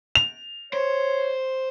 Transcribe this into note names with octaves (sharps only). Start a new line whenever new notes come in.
F7
C5 C#5